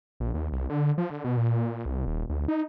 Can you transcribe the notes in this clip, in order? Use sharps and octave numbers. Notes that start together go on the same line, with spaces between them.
A#1
D#2
C2
D3
F3
D3
B2
A#2
C2
D#1
D2
D#4